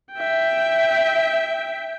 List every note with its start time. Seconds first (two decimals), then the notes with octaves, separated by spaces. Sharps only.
0.14 E5 G5